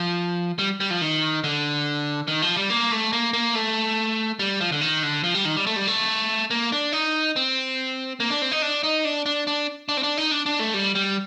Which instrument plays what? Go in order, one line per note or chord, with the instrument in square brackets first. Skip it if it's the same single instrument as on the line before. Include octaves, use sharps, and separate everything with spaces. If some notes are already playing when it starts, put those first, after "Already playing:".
Already playing: [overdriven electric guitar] F3
G3
G3
F3
D#3
D3
D#3
F3
G3
A#3
A3
A#3
A#3
A3
G3
F3
D3
D#3
D3
F3
G3
D#3
G3
A3
G3
A3
A#3
D4
D#4
C4
A#3
D4
C4
D#4
D4
D#4
D4
D4
D4
D4
C4
D4
D#4
D4
D4
A3
G3
G3